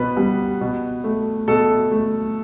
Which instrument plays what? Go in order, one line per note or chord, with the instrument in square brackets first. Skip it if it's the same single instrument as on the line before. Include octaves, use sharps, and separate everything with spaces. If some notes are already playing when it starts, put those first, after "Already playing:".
Already playing: [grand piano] B2 B3 B4
G3 B3
B2
A3
B2 A4
A3